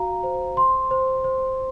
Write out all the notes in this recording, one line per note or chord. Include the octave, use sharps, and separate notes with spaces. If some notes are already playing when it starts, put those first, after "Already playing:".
Already playing: F#4 F5 A#5
C5
C6
C5
C5